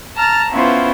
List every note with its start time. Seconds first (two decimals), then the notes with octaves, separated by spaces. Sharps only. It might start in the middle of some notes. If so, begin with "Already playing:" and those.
0.15 A5 A#5 F6 A6
0.50 B3 C#4 E4 F4 B4 C5